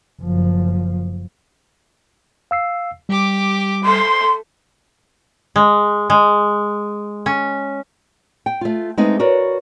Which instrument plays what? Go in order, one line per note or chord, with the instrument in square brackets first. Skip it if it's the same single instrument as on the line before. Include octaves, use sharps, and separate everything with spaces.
[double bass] F#1 F3
[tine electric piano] F5 E6 C7
[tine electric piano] G3 [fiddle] G4 D6
[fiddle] A3 [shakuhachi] C6
[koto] G#3
G#3
C#4
[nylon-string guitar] G5
A3 F4
G#3 A3 B3 C4 D#4
F#4 A#4 B4 C#5 D5